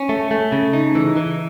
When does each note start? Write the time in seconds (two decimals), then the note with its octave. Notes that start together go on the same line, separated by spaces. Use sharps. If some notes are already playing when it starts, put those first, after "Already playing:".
Already playing: C#4
0.09 A3
0.31 A3
0.52 C#3
0.73 D#4
0.95 E3
1.17 E3